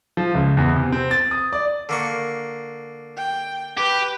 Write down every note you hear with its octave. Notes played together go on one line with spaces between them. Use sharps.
F3
C#2
E2
C3
C4
A6
D#6
D5
D3 A#3 C#6
G5
G4 B4